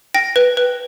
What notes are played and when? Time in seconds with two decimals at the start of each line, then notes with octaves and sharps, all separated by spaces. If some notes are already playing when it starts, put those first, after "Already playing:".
0.15 G5 A#6
0.36 B4
0.57 B4